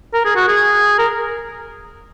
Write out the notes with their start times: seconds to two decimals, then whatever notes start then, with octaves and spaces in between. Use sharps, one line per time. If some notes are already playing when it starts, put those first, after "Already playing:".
0.14 A#4
0.25 G#4
0.36 F#4
0.48 G#4
0.99 A#4